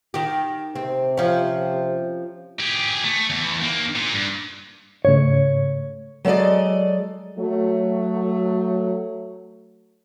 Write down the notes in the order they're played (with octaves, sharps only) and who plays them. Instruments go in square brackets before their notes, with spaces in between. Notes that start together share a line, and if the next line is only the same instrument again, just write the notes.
[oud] D#3 G4
[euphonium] C3 [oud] C4
[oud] F3 C#4
[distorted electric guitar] G4 G#4
A3
E2
D#2 A#3
A#2
G2
[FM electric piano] G#2 C#3 A3 [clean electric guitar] C#5
[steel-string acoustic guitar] F#3 G#3 A4 D5 D#5
[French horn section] F#3 A3